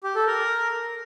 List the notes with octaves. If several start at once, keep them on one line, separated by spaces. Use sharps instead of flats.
G4
A4
A#4